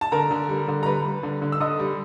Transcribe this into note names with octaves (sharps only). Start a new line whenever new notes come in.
A5
D3 A#4 A#5
D3
G3
D3
A#5
G3 B4 B5
G3
D3
D3
E6
D3 D#5 D#6
G3